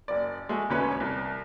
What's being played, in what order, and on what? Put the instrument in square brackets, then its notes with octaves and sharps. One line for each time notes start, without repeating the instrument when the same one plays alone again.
[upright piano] F#1 D5
G#3 A3 F#4
E1 D2 C#4 B4 C#5
C2